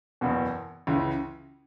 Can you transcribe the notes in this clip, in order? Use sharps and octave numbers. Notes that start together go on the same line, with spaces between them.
F#1 E2 B2
C#2 C#3 E3